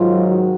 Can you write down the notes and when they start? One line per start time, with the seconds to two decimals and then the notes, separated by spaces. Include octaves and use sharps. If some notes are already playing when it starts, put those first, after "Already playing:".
Already playing: G#2 D#3 F#3 F4
0.26 F#4